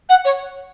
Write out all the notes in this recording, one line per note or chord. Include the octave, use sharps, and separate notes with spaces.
F#5
C#5